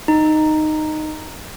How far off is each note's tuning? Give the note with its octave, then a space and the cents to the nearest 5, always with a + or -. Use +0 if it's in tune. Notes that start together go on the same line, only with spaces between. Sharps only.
D#4 -10